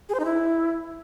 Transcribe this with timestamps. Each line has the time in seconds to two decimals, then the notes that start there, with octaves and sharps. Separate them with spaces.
0.09 G#4
0.14 C5
0.20 D#4
0.25 E4